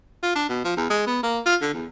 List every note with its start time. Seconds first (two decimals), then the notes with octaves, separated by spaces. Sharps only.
0.23 F4
0.35 D4
0.49 B2
0.64 F3
0.77 E2
0.90 G#3
1.07 B3
1.23 A#3
1.46 F4
1.61 D3
1.74 E2